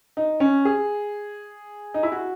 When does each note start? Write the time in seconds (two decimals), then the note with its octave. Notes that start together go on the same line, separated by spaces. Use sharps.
0.17 D#4
0.40 C#4
0.65 G#4
1.94 D#4
2.03 E4
2.12 F#4